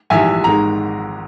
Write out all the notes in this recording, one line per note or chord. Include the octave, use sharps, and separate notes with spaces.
A#1 G#2 E3 G3 E5 G#5
G#1 G#2 D#3 G#3 A#5